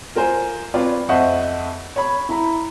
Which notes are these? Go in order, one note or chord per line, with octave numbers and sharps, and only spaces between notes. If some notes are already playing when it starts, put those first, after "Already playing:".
F4 A#4 C5 G#5
C4 F4 B4 C#5 D5
F2 C5 D#5 E5 F#5 C#6
C#5 B5
E4 A#5 B5